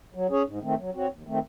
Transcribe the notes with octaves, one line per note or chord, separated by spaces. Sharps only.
F#3
C#4 G#4 C#5
G#2
D#3 A3 C4
F#3
C4 F#4 C#5
D#2
D#3 A3 C4